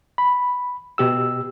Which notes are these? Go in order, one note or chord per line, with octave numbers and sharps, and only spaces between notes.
B5
B2 G4 E6